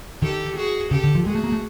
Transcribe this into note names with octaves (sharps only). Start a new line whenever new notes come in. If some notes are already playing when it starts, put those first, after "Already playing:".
D#3 G4 A4
F#4 G#4
C#3 G4 A4
D3
F3
G#3 F#4 G#4
A3
A#3
A3